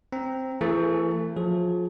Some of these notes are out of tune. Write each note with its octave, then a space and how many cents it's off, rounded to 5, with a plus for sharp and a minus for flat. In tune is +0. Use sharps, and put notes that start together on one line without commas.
C4 +0 A#5 +0
E3 +35 A3 +35 G#4 +0
F3 +25 G#4 +35